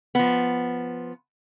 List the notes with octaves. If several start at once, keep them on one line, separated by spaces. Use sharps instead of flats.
F3 B3